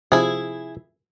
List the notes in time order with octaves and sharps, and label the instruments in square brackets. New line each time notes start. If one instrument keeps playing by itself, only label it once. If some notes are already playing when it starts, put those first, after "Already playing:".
[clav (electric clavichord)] C3 F3 [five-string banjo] E4 G#4